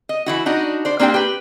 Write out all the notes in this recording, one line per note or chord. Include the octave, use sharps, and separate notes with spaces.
D#5
E3 E4 F#4
D4 D#4 F#4
C5 D5
A#3 C4 D4 G4 G5
G4 B4